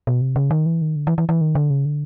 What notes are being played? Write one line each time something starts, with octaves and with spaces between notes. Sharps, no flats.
B2
C3
C#3
D#3
E3
D#3
D3
E3
E3
E3
D#3
D3
C#3
D3